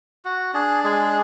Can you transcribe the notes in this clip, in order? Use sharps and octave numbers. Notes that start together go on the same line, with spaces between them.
F#4
D4 G#4
G#3 G#4